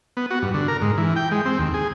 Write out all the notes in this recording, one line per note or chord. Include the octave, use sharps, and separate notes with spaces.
B3
F#4
G2
D3
A#4
G#2
E3
G5
G#3
C4
D#2
G#4